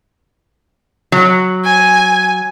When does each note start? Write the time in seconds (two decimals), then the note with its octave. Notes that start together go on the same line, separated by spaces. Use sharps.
1.12 F#3
1.65 G#5